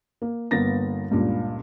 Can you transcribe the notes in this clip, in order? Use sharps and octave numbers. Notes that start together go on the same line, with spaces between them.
A#3
G1 A#3 B3 A6 A#6
C#2 G2 A#2